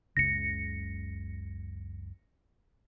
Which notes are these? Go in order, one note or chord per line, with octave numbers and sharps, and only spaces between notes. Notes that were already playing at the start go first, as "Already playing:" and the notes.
F#1 C#2 C#3 A#6 C#7